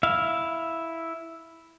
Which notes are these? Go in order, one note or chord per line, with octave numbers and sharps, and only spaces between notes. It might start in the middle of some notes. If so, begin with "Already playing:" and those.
E4 E5 F5